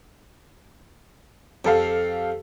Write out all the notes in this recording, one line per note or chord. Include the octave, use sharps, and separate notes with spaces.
F2 G4 A4 F5